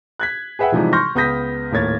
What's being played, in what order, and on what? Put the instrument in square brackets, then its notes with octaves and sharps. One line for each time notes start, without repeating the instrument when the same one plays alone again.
[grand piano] F#6 G#6 B6
G#4 B4 E5 F#5 G5
C3 E3 F3 G3 G#3 D#4
C6 C#6 F6 G6 A#6
C#2 B3 D#6 G6 A#6 B6
D#1 A2 A#3 C#5 G#6 A6